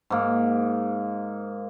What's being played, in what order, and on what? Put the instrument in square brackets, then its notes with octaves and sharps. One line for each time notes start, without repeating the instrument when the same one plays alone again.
[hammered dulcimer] G#2 A#3